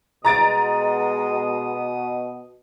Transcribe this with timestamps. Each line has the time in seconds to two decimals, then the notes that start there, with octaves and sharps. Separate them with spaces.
0.25 B2 G#3 A#5 D#6 A6 D7